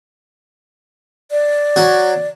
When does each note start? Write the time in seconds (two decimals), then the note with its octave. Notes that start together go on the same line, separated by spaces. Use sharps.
1.31 D5
1.76 F#3 F#4